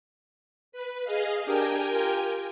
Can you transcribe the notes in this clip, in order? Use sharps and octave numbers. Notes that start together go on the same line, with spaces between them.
B4
G#4 D#5 F5
D4 G4 A#4 G5 G#5
F4 G4